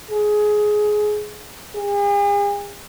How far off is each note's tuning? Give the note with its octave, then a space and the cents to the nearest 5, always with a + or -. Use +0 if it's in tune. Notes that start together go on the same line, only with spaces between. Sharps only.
G#4 +15
G#4 -45